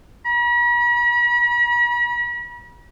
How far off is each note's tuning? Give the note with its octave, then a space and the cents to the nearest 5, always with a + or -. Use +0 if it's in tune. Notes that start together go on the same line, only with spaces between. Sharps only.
B5 -45